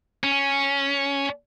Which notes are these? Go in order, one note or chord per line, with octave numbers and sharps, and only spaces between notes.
C#4